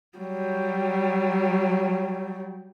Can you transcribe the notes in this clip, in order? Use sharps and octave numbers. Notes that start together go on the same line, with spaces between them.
F#3 G3